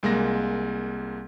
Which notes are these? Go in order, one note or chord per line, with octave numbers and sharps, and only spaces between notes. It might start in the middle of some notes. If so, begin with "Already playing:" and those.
C2 G#3 A#3 A#6